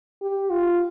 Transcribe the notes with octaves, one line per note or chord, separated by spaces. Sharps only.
G4
F4